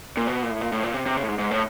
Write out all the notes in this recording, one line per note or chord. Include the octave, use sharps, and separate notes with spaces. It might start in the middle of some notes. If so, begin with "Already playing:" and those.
A#2
B2
A#2
A2
A#2
A2
A#2
C3
C3
C#3
A2
G#2
G#2
A2